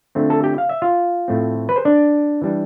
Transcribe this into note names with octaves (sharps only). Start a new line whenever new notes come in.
D3 F3 A3 C4
A4 A5
G4 G5
F5
E5
F4 F5
A2 F3 A3 C4
B4
C5
D4 D5
E3 G3 D4